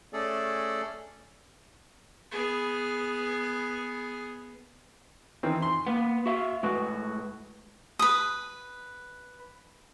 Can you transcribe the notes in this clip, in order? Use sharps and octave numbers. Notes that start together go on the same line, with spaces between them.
A3 C#4 G#4 A4 D5
B3 G#4
D#3 E3 C4
C6
A#3 B3
F#4 E5 F5
A2 G#3 F#4 B4
B4 D#6